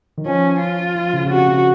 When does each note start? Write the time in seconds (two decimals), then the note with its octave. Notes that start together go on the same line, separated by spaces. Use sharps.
0.17 D#3
0.25 F3 C#4
0.60 F4
0.95 F3
1.13 C#3
1.25 C#3
1.30 C3 F#4
1.48 C3